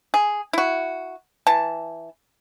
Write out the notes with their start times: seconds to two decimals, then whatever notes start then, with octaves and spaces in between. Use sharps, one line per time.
0.14 G#4
0.53 E4 F#4
1.47 E3 A5